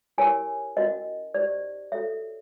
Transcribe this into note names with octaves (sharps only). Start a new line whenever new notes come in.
E4 G4 A#4 C#5 G#5
C#4 F#4 A#4 D#5
D#4 G4 C5 D5
F#4 A4 C#5 E5